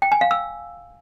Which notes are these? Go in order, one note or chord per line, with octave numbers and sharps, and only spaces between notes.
G5
G#5
F5
E6